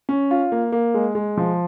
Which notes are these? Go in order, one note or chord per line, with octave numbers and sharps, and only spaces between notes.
C#4
F4
A#3
A#3
G#3
G#3
F3